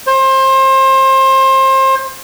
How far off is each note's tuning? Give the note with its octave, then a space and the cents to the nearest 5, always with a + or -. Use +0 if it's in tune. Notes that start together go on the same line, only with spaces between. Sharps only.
C5 +30